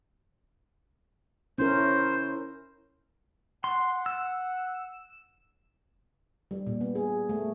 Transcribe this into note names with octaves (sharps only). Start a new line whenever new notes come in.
C#4 E4 A#4 C5
F#5 C6
E6
G3
A#2
B3
G#4
A3